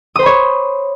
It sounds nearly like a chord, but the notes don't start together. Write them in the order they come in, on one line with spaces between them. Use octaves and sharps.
D#6 C5 B5 C#5